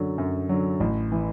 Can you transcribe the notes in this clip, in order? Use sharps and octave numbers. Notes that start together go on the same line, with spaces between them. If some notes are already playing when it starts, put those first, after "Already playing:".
Already playing: F#2 D3 F#3
F#2
D3 F#3
A1
E3